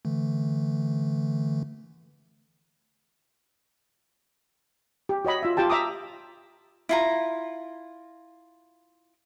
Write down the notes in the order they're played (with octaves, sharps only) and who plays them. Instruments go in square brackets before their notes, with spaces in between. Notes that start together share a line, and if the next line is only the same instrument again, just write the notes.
[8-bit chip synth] D3 E3 A3
[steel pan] G4
F#4 C#5 D#5 B5
F4 E5
F4 G4 G5 A5
E5 A#5 D6 D#6
[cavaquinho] E4 F4 A#5